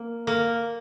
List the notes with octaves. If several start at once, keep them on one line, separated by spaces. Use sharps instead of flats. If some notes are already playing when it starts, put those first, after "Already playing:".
Already playing: A#3
A#3